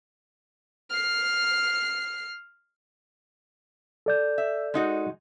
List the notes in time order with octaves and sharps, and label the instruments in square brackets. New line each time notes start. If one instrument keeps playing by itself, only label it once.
[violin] F6 C7
[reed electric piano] A4 D5 G6
[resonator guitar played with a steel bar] E5
G#3 D#4 F#4